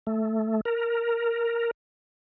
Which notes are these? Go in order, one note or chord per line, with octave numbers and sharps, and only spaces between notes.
A3
A#4